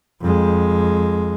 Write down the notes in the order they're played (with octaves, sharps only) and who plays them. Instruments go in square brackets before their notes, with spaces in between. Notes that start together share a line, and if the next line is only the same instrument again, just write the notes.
[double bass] F2 G#3